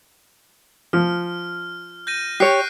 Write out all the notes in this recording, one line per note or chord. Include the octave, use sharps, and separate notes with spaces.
F3 F6
G6 A#6 D#7
G4 C#5 F#6 C7 D7